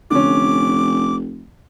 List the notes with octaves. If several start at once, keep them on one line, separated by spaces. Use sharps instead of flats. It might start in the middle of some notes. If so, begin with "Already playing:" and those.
F1 D3 C#4 D6